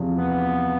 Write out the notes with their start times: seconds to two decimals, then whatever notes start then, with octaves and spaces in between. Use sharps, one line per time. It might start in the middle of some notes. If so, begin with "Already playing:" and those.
Already playing: E2 C3 F3
0.16 B3